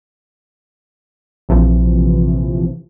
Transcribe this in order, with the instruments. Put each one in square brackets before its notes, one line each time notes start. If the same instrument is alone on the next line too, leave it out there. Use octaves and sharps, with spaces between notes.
[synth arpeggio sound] A#1 C3 E3 F3